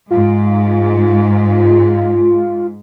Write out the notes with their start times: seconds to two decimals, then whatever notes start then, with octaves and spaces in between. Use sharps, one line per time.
0.10 G#2 F4